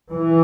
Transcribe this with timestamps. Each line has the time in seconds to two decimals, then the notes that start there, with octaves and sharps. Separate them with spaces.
0.12 E3